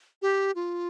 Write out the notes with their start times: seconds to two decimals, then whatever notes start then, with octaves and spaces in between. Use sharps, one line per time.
0.22 G4
0.55 F4